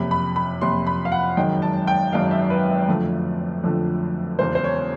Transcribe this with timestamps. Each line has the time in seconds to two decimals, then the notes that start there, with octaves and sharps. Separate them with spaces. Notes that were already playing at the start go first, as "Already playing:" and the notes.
Already playing: F#1 F2 C3 B5
0.11 B5
0.36 B5
0.61 F#1 F2 C3 C6
0.87 B5
1.05 F5
1.12 F#5
1.37 G#1 F#2 D#3 G#3 G5
1.62 A5
1.87 G5
2.12 G#1 F#2 D#3 G#3 F5
2.31 E5
2.50 B4
2.88 F2 D3 F3 A3
3.64 F2 D3 F3 A3
4.39 E1 E2 C#3 C5
4.55 C5
4.64 C#5